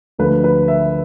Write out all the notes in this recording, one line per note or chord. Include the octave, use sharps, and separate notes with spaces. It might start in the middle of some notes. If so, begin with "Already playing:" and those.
D2 D3 F3 A3 B4
B4
E5